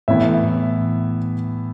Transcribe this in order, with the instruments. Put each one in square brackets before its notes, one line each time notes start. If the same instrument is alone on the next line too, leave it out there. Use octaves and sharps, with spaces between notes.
[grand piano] A2 E3 B3 E4 E5